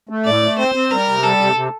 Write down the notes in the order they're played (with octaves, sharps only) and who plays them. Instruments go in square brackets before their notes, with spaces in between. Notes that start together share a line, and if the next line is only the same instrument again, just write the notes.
[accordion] A3
[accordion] A2 [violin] D5
[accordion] A3
[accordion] C4 [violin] C5
[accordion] C4
[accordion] G3 [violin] A#4
[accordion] C3
[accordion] G3 [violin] A4
[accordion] C3
C3